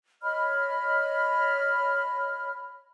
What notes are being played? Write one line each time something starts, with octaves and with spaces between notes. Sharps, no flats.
C#5 D#5 B5 F6